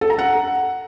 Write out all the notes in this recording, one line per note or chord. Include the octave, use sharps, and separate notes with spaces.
A4
A#5
F#5